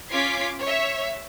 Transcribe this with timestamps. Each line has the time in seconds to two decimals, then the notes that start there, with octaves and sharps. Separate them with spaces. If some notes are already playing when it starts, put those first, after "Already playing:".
0.10 C#4 F4 D6 G#6 B6 C7
0.60 C#5 E5